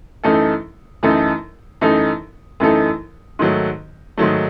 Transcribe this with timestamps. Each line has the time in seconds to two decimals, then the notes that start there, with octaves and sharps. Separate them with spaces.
0.24 F#2 E3 A3 D#4 A4
1.03 F#2 E3 A3 D#4 A4
1.81 F#2 E3 A3 D#4 A4
2.60 F#2 E3 A3 D#4 A4
3.39 G#2 D#3 F#3 A3
4.17 G#2 D#3 F#3 A3